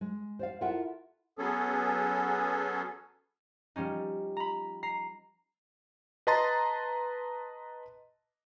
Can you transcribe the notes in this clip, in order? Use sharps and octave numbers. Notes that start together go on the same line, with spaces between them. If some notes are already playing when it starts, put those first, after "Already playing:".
G#3
C5 D5 F5
E4 F4 A4 A#4 E5 F#5
F#3 B3 C#4 G#4 A4
F3 G3 C#4 D#4
A#5 B5
A#5 C7
B4 D#5 A5 A#5 C6 A6